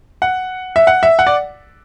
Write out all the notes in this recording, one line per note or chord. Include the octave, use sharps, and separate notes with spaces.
F#5
E5
F#5
E5
F#5
D5